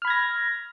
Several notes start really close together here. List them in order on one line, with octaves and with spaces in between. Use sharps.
F6 B5 G#6 A#6